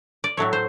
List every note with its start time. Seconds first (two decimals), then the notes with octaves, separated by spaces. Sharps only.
0.24 D5
0.37 A2 F#3 A3 C#5
0.53 C5